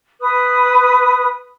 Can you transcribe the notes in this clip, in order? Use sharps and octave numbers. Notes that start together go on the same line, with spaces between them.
B4 D#6